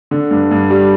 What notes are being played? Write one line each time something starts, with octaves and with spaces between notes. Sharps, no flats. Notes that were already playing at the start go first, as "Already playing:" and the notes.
D3
G2
G2
G3